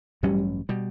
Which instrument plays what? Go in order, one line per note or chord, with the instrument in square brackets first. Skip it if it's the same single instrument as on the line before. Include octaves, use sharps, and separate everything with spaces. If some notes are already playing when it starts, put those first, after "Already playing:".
[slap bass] A1 G2 F#3 C#4 [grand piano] G3
[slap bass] B2 G3